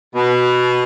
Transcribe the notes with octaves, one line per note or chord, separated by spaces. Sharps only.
B2